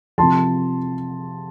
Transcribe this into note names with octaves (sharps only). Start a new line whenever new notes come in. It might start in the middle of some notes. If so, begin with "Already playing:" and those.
C3 F3 A5 C6